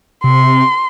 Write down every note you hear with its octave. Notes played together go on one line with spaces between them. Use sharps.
C3 C6